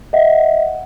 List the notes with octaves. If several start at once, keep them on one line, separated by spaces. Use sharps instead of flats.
D#5 E5 F#5